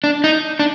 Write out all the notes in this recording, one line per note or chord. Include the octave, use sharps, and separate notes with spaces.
D4
D#4
D4